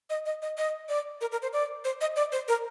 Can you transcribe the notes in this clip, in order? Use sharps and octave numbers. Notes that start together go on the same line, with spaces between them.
D#5
D#5
D#5
D#5
D5
A#4
A#4
C5
D5
C5
D#5
D5
C5
A#4